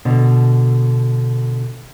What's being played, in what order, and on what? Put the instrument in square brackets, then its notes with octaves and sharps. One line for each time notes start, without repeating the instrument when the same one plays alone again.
[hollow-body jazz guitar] B2 D3